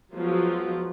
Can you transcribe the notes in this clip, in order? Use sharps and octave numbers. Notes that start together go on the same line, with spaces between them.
F3 F#3 G#3 B3 F4 F#4